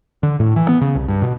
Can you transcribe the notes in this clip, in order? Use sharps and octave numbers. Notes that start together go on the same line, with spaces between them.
D3
A2
E3
B3
C#3
C2
G2
B2